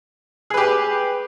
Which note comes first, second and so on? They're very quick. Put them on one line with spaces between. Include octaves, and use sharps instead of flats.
G#4 B4 G4